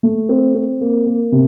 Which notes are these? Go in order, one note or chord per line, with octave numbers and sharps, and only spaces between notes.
A3
C4
C4
A#3
A#3
C3